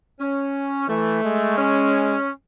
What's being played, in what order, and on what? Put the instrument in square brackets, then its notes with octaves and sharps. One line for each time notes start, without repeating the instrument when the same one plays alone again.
[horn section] C#4
[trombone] E3 [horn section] A3
[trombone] G#3
[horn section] C#4